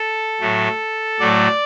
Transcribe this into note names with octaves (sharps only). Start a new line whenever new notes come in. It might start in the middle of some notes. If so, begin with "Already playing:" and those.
Already playing: A4
A2 F#3 A3
A2 F#3 A3 D5